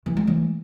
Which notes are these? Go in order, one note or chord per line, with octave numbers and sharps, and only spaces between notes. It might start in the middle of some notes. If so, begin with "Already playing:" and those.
E3
G#3
E3